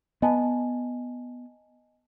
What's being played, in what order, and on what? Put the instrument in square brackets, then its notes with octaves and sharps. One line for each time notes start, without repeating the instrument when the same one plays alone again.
[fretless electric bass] B3 [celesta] D#5 G#5 A5